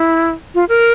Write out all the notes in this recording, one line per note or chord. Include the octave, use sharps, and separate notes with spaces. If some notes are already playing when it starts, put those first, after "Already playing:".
Already playing: E4
F4
A#4